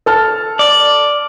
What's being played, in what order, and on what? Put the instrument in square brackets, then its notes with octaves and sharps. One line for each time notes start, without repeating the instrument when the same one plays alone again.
[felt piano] A4 A5 F6
[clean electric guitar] D5